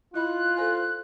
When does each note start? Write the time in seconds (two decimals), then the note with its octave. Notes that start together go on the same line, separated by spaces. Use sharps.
0.14 E4 F4 D#5 B5 F#6
0.57 A4 C5 G#5